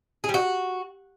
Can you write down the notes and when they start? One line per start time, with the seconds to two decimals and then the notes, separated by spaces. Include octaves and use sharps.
0.24 G#4
0.29 G3
0.34 F#4